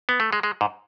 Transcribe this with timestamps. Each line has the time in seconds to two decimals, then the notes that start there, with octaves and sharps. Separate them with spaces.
0.09 B3
0.20 A3
0.33 G#3
0.43 G#3
0.61 G#2